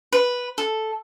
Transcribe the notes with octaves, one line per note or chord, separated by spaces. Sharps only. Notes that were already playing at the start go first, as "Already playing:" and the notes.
B4
A4